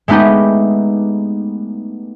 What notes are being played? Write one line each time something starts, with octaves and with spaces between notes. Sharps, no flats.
G#3 A3 B3 D#4 G4